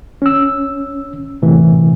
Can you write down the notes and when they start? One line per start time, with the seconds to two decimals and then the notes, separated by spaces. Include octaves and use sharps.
0.22 C#4 E6
1.42 A2 C3 E3